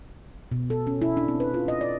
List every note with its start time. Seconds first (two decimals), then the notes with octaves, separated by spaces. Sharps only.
0.52 B2
0.70 A4
0.87 C#4
1.02 E4
1.17 D4
1.28 C4
1.40 B4
1.54 F4
1.68 D#5
1.81 D5